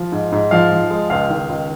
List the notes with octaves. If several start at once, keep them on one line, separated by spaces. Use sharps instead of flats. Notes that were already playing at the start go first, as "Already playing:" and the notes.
Already playing: F3
G#2
G#2
F3 F5
F3
G#3
C#2 F5
D#3
C#2